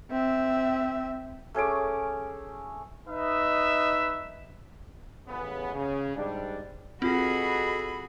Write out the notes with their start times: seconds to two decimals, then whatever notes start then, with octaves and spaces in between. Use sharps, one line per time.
0.11 C4 E5
1.54 A3 C#4 G#4 D6
3.08 D#4 B4 D#5 E5
5.27 A1 C#3 B3
5.73 C#3
6.16 G#2 G3 D4
7.02 B2 C4 F4 F#4 G#4 A4 B5